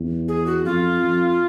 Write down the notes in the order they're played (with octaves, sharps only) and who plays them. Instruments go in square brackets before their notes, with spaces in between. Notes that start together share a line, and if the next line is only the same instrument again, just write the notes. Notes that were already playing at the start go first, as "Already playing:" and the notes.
Already playing: [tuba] E2
[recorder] G#4
F#4
[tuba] F2 [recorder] F4
[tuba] F2